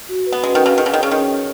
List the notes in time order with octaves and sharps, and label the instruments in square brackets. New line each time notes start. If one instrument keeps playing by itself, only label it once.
[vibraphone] F#4
B4
[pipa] B3
[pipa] G#3 [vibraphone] C#4
[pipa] D#3
[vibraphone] F#5
[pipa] C#3
[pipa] D#3 [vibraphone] G#4
[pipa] C#3
[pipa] D#3 [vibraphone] C#5
[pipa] C#3
[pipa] D#3 [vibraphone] C#4
[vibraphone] C#4